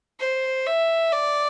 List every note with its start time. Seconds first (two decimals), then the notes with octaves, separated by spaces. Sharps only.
0.20 C5
0.67 E5
1.13 D5